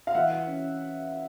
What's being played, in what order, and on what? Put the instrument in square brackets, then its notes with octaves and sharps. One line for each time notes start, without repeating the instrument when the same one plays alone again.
[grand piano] F5
E3 E5 F#5
C#4